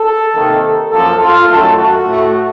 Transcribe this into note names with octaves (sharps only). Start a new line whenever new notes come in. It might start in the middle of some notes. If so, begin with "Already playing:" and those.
Already playing: A4
C3 D#3 A#3
F#2 F3 A#3 A4
F4
F#2 D#3 A3 A4
F#4
A2 A3